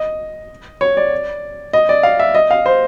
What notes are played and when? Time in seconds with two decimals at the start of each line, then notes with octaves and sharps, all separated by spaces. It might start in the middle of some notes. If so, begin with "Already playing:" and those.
Already playing: D#5
0.81 C#5
0.97 D5
1.73 D#5
1.89 D5
2.03 F5
2.19 E5
2.35 D#5
2.51 F5
2.66 C5